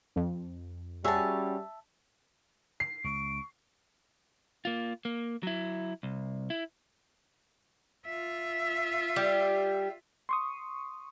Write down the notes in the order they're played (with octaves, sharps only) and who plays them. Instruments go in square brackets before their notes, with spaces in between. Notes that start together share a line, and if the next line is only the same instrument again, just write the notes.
[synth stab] F2
[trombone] G3 [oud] C#4 F#4 G#4 [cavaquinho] E5 A5
[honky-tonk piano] C7
[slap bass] C#2 [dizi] C#6 [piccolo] D7
[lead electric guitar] A#3 F4
A#3
F#3 E4
C2
E4
[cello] F4 E5
[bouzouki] G3 G4
[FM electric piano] C6 C#6 D#6